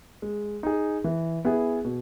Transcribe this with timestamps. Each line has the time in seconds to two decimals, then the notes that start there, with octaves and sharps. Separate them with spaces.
0.22 G#3
0.63 D#4 G#4
1.04 E3
1.45 B3 E4 G#4
1.85 B2